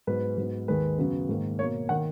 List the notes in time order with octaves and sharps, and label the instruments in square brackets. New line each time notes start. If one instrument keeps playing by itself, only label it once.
[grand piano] G#2 F#3 B3 B4
G#2 F#3 B3
D#2 D#3 G#3 B4
F#2 C#3 F#3 B3
G#2 D#3 A#3
B2 A#3 C#5
D#3 A#3 F#5